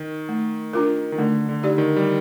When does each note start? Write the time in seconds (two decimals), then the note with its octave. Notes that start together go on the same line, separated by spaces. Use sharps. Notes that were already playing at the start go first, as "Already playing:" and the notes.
Already playing: D#3
0.29 A3
0.73 D4 F4 A#4
1.12 D#3
1.18 D3 A3
1.49 D3
1.63 D#4 G4 D5
1.78 D#3
1.96 G3